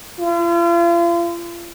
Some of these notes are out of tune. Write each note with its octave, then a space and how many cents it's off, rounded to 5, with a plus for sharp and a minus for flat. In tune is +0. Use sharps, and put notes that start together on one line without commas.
F4 -40